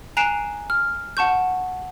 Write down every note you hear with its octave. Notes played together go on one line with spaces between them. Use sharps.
G#5 A#5 F#6 C7 D7 E7
F6
F#5 A5 C#6 G6